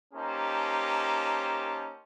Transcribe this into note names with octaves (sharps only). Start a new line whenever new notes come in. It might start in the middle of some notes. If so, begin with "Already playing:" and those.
A#3 C#4 D#4 G4 C5 A5